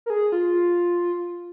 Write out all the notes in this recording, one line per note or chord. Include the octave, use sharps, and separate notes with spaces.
A#4
G#4
F4